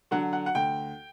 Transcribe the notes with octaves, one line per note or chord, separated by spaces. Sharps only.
D3 F#3 F#5
F#5
F#5
D2 G5